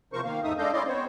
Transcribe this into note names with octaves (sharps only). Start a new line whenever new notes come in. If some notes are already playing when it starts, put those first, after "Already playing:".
E2 C3 F3 A#4 C5 C#6
D#3 A#3 F5
E2 G#2 A3 D#4 E5 D#6
G#3 D4 A4 D#5 F5 G6
C#4 E4 D5 D#5 C6
B3 C4 C5 C#5